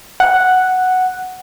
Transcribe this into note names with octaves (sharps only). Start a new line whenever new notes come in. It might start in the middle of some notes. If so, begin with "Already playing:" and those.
F#5